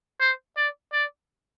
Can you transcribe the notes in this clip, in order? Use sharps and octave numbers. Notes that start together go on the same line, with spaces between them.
C5
D5
D5